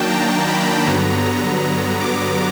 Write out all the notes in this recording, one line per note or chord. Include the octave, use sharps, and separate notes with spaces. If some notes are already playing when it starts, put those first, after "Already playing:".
Already playing: D#3 F#3 A#3 D4 G5 A5
A#5
B5
G2 D3 F#3 B3 A#5
A#5
D6